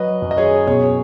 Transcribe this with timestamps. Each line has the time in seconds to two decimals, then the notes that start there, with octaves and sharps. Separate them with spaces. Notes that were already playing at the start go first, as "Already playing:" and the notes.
Already playing: F#3 B4 D#5
0.22 F#2
0.31 D#5
0.37 G#4 C#5
0.67 B2 G#4 C#5